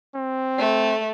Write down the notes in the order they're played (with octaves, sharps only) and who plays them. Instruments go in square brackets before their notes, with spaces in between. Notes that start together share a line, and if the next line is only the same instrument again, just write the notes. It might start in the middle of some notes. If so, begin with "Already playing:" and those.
[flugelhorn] C4
[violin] A3